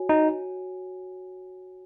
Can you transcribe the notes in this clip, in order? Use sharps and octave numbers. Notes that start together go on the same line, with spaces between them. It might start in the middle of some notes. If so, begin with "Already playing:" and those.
Already playing: F#4 C#5 G#5
D#4